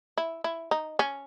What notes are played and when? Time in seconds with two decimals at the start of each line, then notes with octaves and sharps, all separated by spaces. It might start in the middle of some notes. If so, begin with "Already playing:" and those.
0.17 E4
0.44 E4
0.71 D#4
0.99 C#4